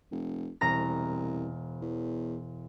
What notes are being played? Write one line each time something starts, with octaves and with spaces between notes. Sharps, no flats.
F1
E1 C2 A#5 A#6
E2